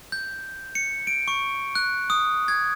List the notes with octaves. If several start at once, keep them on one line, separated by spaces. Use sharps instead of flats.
G6
C#7
D7
C#6
F#6
D#6
G#6